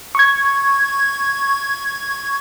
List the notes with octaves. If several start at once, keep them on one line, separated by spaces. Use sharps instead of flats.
C#6 G#6